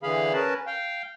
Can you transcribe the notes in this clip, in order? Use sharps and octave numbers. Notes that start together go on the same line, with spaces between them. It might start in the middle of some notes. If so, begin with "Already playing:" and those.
D3 E3 G#4 F5 B5
C#4 A#4 B4 A5
F5 G5